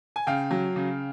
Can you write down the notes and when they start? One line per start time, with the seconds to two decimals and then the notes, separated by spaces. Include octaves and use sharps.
0.16 G#5
0.27 C#3 F5 G5
0.51 F#3
0.76 C#3